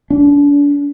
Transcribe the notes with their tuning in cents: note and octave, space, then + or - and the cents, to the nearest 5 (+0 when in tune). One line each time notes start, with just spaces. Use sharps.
D4 -35